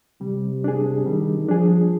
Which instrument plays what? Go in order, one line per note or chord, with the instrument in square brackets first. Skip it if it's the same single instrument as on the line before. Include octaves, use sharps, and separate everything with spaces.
[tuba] C3 [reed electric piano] G3
[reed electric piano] D4 G#4
[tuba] D#3 [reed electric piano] G3
[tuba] F3 [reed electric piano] D4 G#4